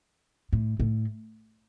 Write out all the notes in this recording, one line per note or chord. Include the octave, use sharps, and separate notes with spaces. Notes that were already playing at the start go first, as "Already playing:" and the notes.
A2
A2